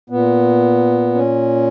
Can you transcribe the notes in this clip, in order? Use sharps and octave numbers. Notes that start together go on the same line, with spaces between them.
A#2 B3
C#4